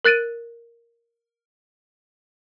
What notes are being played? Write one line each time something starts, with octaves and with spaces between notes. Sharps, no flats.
A#4 F#6 A6 D7 D#7